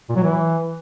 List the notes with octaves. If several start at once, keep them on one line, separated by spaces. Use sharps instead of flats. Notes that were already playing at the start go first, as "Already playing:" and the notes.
A#2
F#3
E3